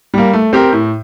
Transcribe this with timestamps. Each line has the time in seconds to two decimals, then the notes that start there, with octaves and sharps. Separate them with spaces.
0.14 G3 A#3
0.33 A3
0.53 C4 G4 A#4
0.72 A2